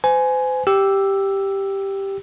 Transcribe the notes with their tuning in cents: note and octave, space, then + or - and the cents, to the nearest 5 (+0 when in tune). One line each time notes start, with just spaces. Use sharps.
C5 -40 G#5 +10
G4 +0 E6 +5